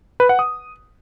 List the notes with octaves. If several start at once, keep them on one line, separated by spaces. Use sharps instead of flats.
B4
F#5
D#6